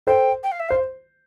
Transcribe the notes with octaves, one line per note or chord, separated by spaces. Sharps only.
A4 C5 G5
G5
F5
E5
C5 F5